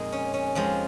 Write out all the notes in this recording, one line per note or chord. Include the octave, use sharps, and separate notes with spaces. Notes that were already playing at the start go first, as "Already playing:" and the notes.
Already playing: F2 A#2 G#3 D#4 G#4 A#4
C#4
C#4
F2 F3 G#3